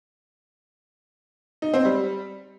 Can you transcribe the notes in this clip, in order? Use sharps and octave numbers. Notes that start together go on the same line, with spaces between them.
D#4
C4
G3